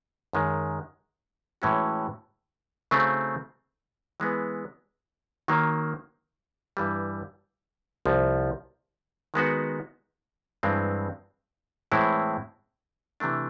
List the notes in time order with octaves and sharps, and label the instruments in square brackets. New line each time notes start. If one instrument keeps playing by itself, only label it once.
[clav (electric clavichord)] F#2 D#3 G#3
A2 E3 G#3 C#4 F#4
C#3 F#3 A3 C4 D#4
E3 G#3 B3
D#3 F#3 A#3
G2 E3 G3
C2 C3 F3
D#3 G#3 B3 D#4 F#4
G2 E3 G#3 C4 E4
A2 E3 G#3 C4 E4
C3 E3 A3 D4